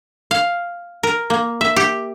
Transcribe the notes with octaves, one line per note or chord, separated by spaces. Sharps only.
F5
A#4
A#3
E5
G4